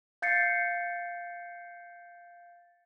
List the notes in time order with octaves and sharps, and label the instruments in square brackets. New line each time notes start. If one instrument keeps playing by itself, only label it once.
[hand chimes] F5 G6 A6 C7 C#7